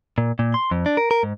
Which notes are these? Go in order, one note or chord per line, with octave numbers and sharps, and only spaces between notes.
A#2
A#2
C6
F2
D4
A#4
A#4
G#2